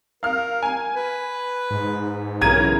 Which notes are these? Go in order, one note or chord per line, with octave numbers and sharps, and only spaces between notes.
A#4 F5 F6
G#5
B4
G#2
B1 C#3 E3 C#4 A#4 A#5 G#6 D#7